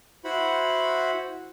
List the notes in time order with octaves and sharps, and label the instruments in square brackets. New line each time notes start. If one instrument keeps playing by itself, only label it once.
[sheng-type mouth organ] E4 F#4 C5 F#5 B5